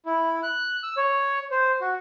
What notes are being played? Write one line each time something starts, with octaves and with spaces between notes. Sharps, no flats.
E4
F#6
E6
C#5
C5
F#4